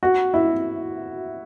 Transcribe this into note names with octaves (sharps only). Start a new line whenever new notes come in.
F#4
E4